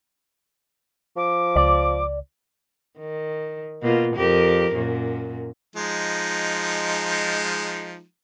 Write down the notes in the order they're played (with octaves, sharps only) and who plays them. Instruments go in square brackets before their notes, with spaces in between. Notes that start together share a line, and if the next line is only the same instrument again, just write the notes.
[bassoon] F3 [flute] D6
[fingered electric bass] C#2 [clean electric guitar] D5
[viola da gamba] D#3
B2 A#3 F4
F2 G4 A#4
F#2 A#2
[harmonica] F3 G#3 D#4